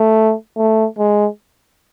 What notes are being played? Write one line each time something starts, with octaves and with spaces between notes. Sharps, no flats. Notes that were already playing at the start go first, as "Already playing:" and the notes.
Already playing: A3
A3
G#3